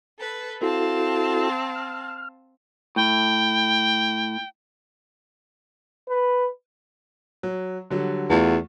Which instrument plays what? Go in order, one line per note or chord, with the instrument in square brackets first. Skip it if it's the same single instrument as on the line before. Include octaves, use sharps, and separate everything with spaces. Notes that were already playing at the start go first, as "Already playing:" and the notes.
[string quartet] A4 B4
[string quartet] C4 F5 A5 [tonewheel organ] E4 F#4 A4
[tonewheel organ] F6
[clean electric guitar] A2 [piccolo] G5
[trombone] B4
[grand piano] F#3
D3 F#3 G3
[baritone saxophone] E2 [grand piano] A3 F4 F#4